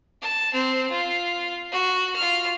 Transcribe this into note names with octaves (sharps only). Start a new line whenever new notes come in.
A5
C4
F4
F#4
F4 F6